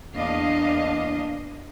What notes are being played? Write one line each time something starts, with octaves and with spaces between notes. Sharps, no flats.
E2 A#3 D4 D#5 F5